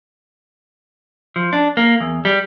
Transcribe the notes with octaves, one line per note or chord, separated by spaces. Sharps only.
F3
D4
A#3
E2
G3